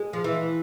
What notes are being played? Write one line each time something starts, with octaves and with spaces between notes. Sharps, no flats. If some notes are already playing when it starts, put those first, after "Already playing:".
Already playing: G#3
F3
E3